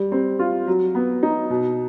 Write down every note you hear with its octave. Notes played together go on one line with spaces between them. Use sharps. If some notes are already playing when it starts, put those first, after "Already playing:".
Already playing: G3
C4
F4
F#3
B3
D#4
B2